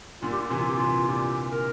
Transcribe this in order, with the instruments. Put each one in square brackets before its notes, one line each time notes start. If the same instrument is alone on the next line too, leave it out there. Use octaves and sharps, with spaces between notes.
[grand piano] A#2 D3 [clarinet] F4
[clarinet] G4
F4
[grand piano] C3 E3 [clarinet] G4
[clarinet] F4
G4
[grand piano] C3 E3 [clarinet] F4
[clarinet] F4
[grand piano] A#2 D3 [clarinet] G4
[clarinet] A#4